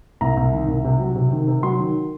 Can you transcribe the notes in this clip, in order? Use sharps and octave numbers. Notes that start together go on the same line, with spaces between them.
C2 A#5
C2
D#3
C2
C3
F#3
C3
D#3
C3
F#3 C6
D#3